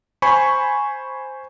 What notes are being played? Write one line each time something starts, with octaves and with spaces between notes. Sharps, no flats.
C5 G#5 B5 C#6